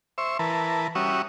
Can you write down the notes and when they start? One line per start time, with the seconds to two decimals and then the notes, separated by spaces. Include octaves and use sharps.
0.18 C5 E5 C#6
0.39 E3 A#4 B4 A5
0.95 G3 C#4 F#4 E5 C#6 D#6